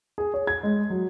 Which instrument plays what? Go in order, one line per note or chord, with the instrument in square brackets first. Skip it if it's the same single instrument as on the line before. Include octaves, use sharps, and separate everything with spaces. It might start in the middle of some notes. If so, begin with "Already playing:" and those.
[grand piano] G#4
C#5
G#6
G#3
F#3